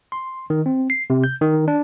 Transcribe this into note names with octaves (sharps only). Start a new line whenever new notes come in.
C6
D#3
C4
C7
C3
G6
D#3
D4